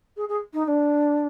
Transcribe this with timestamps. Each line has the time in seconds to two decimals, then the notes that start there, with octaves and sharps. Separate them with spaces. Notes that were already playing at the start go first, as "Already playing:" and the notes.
0.17 G#4
0.29 G#4
0.54 D#4
0.65 D#4
0.68 D4